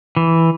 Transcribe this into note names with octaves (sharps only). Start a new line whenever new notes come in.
E3